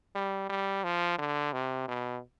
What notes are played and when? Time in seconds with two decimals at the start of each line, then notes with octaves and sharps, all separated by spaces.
0.15 G3
0.49 G3
0.84 F3
1.18 D3
1.53 C3
1.88 B2